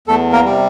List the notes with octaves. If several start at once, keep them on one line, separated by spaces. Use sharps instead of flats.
E2 A3 A4
A#3 A#4
C3 G3